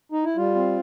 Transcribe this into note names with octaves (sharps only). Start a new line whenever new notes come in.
D#4
E4
G3 F4
C4